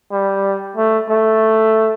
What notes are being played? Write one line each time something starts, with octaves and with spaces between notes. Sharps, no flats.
G3
A3
A3